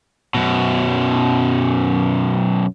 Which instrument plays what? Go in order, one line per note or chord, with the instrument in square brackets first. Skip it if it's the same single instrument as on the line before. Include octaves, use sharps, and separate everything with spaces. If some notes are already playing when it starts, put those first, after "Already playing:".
[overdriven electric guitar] F#2 B2